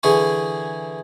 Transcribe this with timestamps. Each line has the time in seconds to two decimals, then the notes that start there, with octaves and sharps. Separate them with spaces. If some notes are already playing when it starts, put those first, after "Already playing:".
0.03 D3 E3 G#4 G#5 C#6